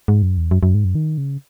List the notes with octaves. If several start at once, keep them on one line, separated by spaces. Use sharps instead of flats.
G#2
F#2
E2
F#2
F#2
G#2
F#2
D#3
C#3